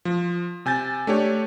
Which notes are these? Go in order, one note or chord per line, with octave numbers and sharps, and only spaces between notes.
F3
C3 G#5 G6 A6
A3 D4 G4 C#5